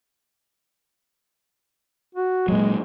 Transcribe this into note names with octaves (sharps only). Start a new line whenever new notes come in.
F#4
A#2 F#3 G#3